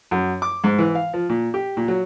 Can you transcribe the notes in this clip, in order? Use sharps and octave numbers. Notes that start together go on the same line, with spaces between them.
F#2
D6
G#2
E3
F5
F3
A#2
G4
A#2
F#3